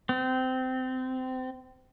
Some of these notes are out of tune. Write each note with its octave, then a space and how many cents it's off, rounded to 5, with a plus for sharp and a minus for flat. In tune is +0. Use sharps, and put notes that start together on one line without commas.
C4 -20